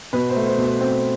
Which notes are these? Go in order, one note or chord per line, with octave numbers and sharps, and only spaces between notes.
B2 B4
C5
A3
C5
B2
C5
C4 C5